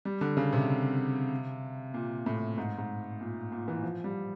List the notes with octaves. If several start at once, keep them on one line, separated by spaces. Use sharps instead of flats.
G3
D3
C#3
C3
A#2
A2
G#2
G#2
A#2
A#2
E3
F3
G3